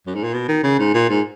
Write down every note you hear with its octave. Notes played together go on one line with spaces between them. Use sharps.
F#2
G#2
A#2
B2
D#3
C#3
G#2
A#2
G#2